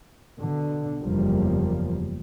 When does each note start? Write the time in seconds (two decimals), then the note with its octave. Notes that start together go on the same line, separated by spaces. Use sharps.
0.39 B2 D3
1.01 F#1 E2 F3 G3 A#3